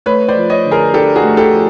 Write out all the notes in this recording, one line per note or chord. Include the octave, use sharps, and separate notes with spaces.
A3 B4 C#5
C5 D5
F3
C#5 D#5
D3
G#4 A#4
D4 G4 A4
F#4 G#4
A3
G4 A4
F3